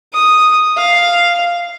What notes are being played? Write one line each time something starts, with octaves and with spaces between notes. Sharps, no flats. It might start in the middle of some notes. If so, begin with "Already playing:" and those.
D#6
F5